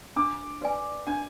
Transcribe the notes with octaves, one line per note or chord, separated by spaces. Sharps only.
D4 D6
F#4 B4 D5 G#5
D4 G#5